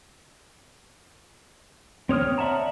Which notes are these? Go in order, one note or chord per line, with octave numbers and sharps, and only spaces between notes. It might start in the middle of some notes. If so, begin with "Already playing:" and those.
C4 C#5 D#6 F6
D5 E5 F#5 A5 A#5